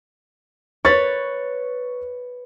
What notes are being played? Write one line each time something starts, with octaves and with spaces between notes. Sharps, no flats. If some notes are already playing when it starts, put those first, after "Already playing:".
B4 C#5 C#6 A6